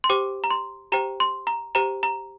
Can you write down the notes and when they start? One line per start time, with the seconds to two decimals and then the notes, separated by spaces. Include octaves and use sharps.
0.04 C6
0.09 G4 C5 G5 D6
0.44 A#5
0.50 C6
0.92 G4 C5 G5 A#5
1.20 C6
1.47 A#5
1.75 G4 C5 G5 A#5
2.03 A#5